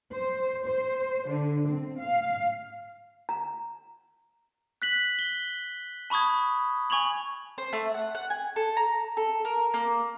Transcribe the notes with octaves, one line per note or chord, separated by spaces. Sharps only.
C5
C5
D3
C4
F5
A#5
F#6 B6 F#7
G7
A5 B5 C#6 D#6 G#6
G#5 C#6 G#6 F7 F#7
C5
A3
F#5
F#5
G#5
A4
A#5
A4
A#4
A#3